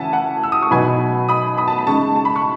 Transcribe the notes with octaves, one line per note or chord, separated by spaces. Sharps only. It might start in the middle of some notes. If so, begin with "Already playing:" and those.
Already playing: C#3 E3 C#4 E5 F#5 G#5 A5
F#5 A5
E6
D#6
C#6
B2 F#3 B3 D#4 G#5 B5
B5 D#6
B5 D#6
A5
B5
C#3 G#3 D#4 A5 C#6
A5
B5
C#6